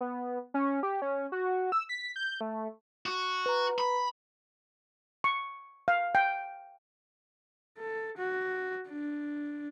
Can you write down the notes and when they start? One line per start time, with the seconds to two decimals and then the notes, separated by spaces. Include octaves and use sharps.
0.01 B3
0.54 C#4
0.83 G4
1.02 C#4
1.32 F#4
1.72 E6
1.89 B6
2.16 G6
2.41 A3
3.06 F#4
3.46 B4 A#5
3.78 B5
5.24 C#6
5.88 F5
6.15 G5
7.78 A4
8.17 F#4
8.89 D4